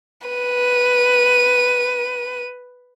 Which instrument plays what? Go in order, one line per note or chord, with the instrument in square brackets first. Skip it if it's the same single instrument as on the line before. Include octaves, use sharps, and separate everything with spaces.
[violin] B4 D#7